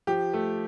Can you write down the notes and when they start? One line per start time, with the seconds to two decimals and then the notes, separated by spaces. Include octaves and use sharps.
0.07 F3 G4
0.34 A3